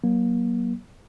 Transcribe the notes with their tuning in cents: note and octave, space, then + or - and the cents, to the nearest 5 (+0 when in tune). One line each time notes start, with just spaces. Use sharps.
F#3 +15 A#3 +30